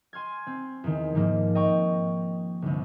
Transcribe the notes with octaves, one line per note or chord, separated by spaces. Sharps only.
G#5 C6 F6 G#6
C4
E2 D#3
G#2 D#3 F3 A#3
D#5 G5 A#5 C#6
G1 C2